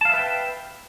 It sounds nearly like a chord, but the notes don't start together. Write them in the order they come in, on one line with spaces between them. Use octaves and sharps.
A5 F5 E5 B4 G5